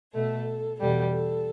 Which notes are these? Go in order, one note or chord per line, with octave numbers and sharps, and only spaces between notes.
B2 A3 A4
E2 B2 G3 A4
A4